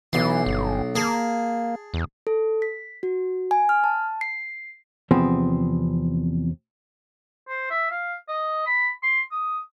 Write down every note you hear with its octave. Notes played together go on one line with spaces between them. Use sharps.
B1 E3 C6
G1
A#3 G#4 A5
E2
A4
B6
F#4
G#5
F6
A5
C7
E2 C3 F3 B3 C4 G#4
C5
E5
F5
D#5
B5
C6
D#6